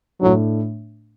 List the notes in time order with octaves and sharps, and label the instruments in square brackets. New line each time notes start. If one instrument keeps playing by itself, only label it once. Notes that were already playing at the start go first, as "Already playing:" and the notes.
[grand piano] A2 A3 D4 [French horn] F#3